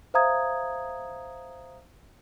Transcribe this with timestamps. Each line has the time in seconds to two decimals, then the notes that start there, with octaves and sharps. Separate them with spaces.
0.14 C5 E5 F5 A#5 D#6 G#6